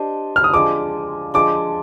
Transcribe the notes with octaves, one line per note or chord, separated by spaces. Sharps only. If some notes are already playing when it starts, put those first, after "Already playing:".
Already playing: D4 G4 C5 D#5
F6
D#6
F3 G#3 D4 D6
F3 G#3 D4 D6